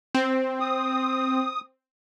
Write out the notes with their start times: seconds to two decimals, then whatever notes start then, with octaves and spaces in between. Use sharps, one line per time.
0.14 C4
0.60 D#6